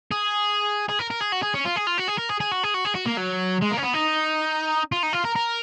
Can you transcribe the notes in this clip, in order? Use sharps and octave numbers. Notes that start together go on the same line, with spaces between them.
G#4
G#4
A#4
A#4
G#4
F#4
G#4
C#4
F4
G#4
F4
F#4
G#4
A#4
G#4
G#4
F#4
G#4
F#4
G#4
F#4
A#3
F#3
G#3
A#3
C#4
B3
D#4
F4
D#4
F4
A#4
A#4